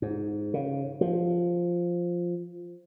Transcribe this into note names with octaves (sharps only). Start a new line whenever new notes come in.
G#2
C#3
F3